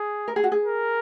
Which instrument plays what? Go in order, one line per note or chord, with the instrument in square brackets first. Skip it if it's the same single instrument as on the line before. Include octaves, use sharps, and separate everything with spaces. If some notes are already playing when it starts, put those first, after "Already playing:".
Already playing: [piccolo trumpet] G#4
[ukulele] A#4
G#4
F#4
G#4
[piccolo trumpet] A#4